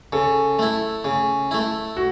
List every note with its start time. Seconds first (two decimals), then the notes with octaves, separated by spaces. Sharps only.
0.13 C#3 A4
0.59 A3 E4
1.04 C#3
1.51 A3 E4
1.97 F#4